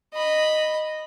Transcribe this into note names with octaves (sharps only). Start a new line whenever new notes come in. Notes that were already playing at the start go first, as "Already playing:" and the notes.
D#5 B5